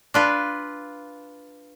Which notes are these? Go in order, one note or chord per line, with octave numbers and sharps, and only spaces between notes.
D4 F4 B4